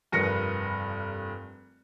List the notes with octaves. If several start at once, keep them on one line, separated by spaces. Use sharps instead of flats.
F1 G2 A#4 B4 A#6 C#7